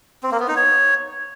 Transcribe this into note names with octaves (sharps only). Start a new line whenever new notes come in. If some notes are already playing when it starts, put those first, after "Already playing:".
C4
A#3
B3
D#4
C#5